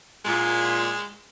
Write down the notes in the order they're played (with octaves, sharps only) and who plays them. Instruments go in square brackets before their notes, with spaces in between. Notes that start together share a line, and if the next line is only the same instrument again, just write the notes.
[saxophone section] A#2 [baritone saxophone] G#3